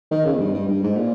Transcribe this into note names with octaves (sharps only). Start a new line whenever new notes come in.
D#3
C#3
E2
G2
G2
G2
G#2
A#2